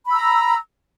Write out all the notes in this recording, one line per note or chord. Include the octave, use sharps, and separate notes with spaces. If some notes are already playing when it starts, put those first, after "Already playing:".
A#5 B5 E6